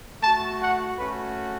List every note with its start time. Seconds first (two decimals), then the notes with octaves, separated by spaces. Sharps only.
0.22 A3 F#4 A5
0.61 F#5
0.99 A3 C#4 F#4 B4